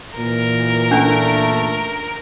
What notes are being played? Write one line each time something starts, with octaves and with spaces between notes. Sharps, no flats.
A#2 E3 A#4
A3 C#4 D4